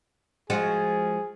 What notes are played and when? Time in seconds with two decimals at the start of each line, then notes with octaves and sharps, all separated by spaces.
0.50 F3 G#3 F#4 G#4